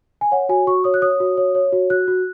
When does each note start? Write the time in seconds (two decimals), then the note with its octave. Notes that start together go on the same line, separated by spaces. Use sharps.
0.21 G#5
0.32 C#5 F#5
0.49 F#4 G#5
0.67 F#4 C#6
0.84 C#5 D#6
0.94 F#6
1.02 C#5 D#6
1.20 F#4
1.37 C#5
1.55 C#5
1.72 F#4
1.90 F#4 F#6
2.08 F#4